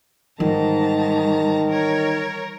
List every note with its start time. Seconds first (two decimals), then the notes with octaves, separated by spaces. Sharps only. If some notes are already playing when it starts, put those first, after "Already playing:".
0.40 G#2 D#3 E3 G3 A5 A#5
1.67 A#4 C#5